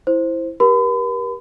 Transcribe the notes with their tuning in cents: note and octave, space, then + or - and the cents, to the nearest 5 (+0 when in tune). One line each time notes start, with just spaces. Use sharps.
E4 +0 C5 +0
G4 +0 A#4 +45 B5 +40